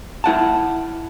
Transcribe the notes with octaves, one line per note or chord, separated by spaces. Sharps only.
E4 F#5 A5